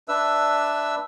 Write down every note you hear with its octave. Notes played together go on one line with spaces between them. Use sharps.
D4 B4 E5 E6